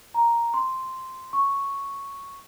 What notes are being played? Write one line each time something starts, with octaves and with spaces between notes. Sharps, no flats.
A#5
C6
C#6